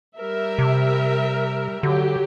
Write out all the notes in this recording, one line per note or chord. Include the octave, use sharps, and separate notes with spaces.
G3 A#4 E5
C3
D3 F#3 G4